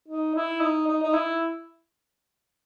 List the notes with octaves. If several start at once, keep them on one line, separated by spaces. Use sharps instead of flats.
D#4
E4
D#4
D#4
D#4
E4